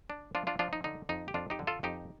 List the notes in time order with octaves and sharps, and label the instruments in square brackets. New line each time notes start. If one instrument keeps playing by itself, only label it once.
[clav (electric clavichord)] D4
F3 D4 F4
D4 F4
F3 D4 F4
D#4
D3 D#4
F2 D#4
G4
F2 D4 F4
D#4 G4
D3
F4 A4
F2 D#4 G4